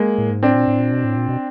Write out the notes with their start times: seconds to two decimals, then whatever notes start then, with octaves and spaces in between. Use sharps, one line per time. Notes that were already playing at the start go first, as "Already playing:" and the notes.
Already playing: G#3 A#3
0.18 A2
0.30 G#2
0.43 A2 C4 D4
0.54 A#2
0.68 A2
0.79 A#2
0.92 B2
1.04 A2
1.16 A#2
1.29 B2